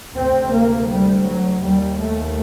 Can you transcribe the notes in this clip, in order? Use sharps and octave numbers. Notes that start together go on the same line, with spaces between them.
D2 C3 C4
A#3
G3
F#3
D#2 G3
A3